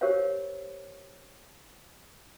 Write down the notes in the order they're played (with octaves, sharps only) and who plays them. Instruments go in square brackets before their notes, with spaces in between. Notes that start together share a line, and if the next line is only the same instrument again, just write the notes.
[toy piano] G4 A#4 C5 C#5 F5